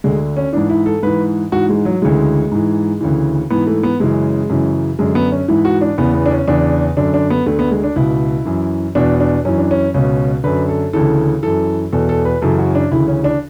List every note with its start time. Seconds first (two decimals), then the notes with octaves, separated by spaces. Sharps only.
0.04 D2 D3 G#3
0.37 C#4
0.53 G#2 E3 D4
0.70 E4
0.86 A4
1.03 G#2 E3 B4
1.52 G#2 E3 F#4
1.69 G#3
1.85 F#3
2.02 D2 C#3 E3 G#3
2.52 G#2 E3
3.01 D2 C#3 E3
3.50 G#2 E3 B3
3.67 A3
3.83 B3
4.00 F#2 C#3 E3 G#3
4.49 F#2 C#3 E3
4.99 F#2 D3 G#3
5.15 B3
5.32 C#4
5.48 G#2 E3 E4
5.65 F#4
5.81 D4
5.98 E2 C#3 E3 B3
6.15 B3
6.26 D4
6.31 C#4
6.48 E2 C#3 E3 D4
6.97 F#2 D3 D4
7.14 D4
7.30 B3
7.46 D2 D3 A3
7.59 B3
7.71 G#3
7.84 D4
7.96 C#2 B2 E4
8.45 F#2 E3
8.95 E2 B2 D4
9.20 D4
9.45 F#2 E3 C#4
9.58 D4
9.71 C#4
9.94 C#2 B2 C#4
10.44 F#2 D3 B4
10.69 A4
10.93 D2 C#3 E3 A4
11.43 F#2 E3 A4
11.93 E2 B2 A4
12.09 A4
12.25 B4
12.42 F#2 C#3 E3 A4
12.59 F#4
12.75 D4
12.91 D2 C#3 E3 E4
13.08 C#4
13.24 D4